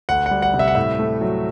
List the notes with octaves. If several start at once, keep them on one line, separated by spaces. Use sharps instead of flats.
D2 F#5
F#5
G3
F#5
C3
E5
F#5
A2 E5
A3
F#3